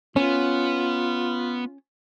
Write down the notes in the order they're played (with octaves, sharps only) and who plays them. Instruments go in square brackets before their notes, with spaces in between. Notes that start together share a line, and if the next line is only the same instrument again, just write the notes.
[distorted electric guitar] B3 [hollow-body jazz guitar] C#4 [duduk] F4